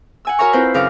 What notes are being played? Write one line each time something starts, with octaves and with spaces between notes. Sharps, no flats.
F#5 G#5 E6
F#4 A#4 C#5 E5 A#5 C#6
C4 E4 F4 B4 C5
F#2 C#3 A#4 F5 D6